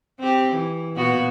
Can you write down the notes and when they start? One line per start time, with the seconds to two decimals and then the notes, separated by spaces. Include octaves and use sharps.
0.20 C4 G4
0.52 E3
0.96 A#2 B3 F#4